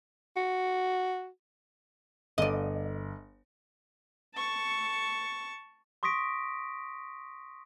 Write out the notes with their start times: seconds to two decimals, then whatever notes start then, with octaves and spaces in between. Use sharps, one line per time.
0.36 F#4
2.38 G1 D5 D#5
4.35 A5 C#6
6.03 C6 C#6 D#6 A#6 B6 D7